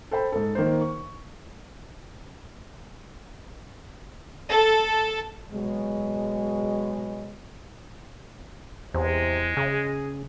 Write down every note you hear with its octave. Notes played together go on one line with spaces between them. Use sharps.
A4 C5 G5 B5
G#2 A4
D#3 A#3 C5
C#6
A4
B2 F#3 G#3
E2 C3 G#3
C#3 G#4